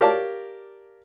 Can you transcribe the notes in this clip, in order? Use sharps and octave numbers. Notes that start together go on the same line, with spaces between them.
G4 A#4 C#5 D5 F5 A5